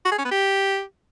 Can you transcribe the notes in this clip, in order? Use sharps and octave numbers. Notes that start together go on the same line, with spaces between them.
F#4
G#4
C#4
B3
G4